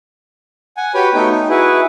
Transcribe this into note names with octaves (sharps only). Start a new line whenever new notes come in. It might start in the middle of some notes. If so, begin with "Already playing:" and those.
F#5 G#5
F#4 G4 B4 C#5 G5 B5
A3 B3 D#4 F#4 G5
D#4
E4 F#4 G#4 B4